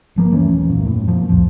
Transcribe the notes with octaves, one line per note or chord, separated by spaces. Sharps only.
G1 F3 A#3
D#1 E3 A3 C#4
C2 F#2 A#2
F#2 A2
F2 A#2 F3
D#1 C2 F3